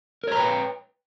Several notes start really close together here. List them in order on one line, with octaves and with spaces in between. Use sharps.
A#4 C#5 A#5 B4 G5